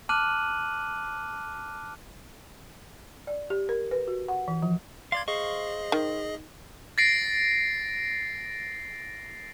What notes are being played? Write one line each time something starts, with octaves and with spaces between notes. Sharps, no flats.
A5 D6 F6 F#6 D#7 F#7
D5
G4
A#4
B4
F#4
F#5
E3
F3
D5 F5 C6 G#6
G#4 C5 D#5 F5 C#6
D#3
A6 A#6 C7 D7